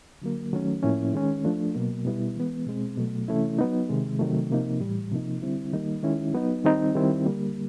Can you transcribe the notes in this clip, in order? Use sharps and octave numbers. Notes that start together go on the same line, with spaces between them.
D3 F#3 A#3
D#3 F#3 A3 C#4
A2 F3 A#3 C#4 E4
D#3 G#3 C#4
F3 A3 D4
B2 F#3 A#3
B2 G3 B3 E4
E3 G#3 B3
B2 G#3 C4
B2 F#3 A3
C3 E3 A3 C#4 E4
F#3 B3 D#4
C3 D#3 G#3
C3 D#3 F#3 A3
C3 F3 A#3 D#4
A2 E3 G3
C3 F3 A#3 D#4
D3 G3 C4 E4
D#3 G3 A#3 D#4
D#3 G#3 C#4 E4
F#3 B3 D#4
D#3 G3 C4 D#4
D#3 G3 C4 E4
D3 G3 A#3